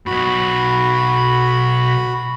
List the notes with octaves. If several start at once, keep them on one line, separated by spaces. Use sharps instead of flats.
B1 G2 F#4 B5